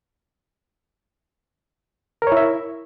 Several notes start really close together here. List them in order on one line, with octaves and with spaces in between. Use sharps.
A#4 C#5 E4 E5